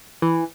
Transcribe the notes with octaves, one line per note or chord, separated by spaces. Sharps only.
E3